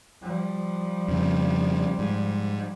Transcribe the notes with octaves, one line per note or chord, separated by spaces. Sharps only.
F3 G3
F2 C#3
G#2